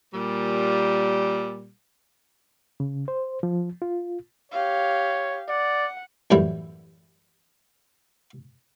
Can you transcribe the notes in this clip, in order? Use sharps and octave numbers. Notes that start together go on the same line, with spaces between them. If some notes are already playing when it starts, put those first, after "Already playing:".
A#2 G3
C#3
C5
F3
F4
G4 C#5 F5
D5 F#5
F#2 A2 E3 G3 E4